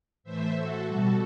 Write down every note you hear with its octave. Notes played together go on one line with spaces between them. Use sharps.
A2 E3 A3 C5 E5
F#4 A4
B2 G3 F#4 A4